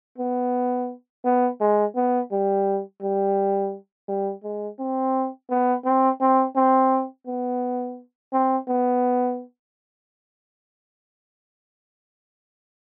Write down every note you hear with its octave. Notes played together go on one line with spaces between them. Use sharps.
B3
B3
G#3
B3
G3
G3
G3
G#3
C4
B3
C4
C4
C4
B3
C4
B3